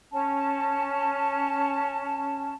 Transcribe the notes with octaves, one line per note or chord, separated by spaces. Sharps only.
C#4 A5